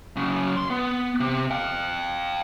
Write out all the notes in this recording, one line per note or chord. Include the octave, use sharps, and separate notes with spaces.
F#2 C#3
C6
B3
C3
F5 G5